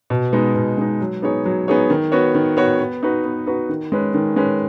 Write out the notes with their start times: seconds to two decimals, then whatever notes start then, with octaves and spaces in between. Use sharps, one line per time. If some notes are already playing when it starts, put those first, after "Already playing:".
0.10 B2
0.33 G#3 B3 D#4
0.55 B2
0.77 G#3 B3 D#4
1.01 F#3
1.22 B3 D#4 G#4 C#5
1.46 F#3
1.68 B3 D#4 G#4 C#5
1.90 D#3
2.12 B3 F#4 C#5
2.35 D#3
2.57 B3 F#4 C#5
2.79 B3
3.03 D#4 F#4 B4
3.24 B3
3.47 D#4 F#4 B4
3.69 D#3
3.92 G#3 C#4 B4
4.14 D#3
4.36 G#3 C#4 B4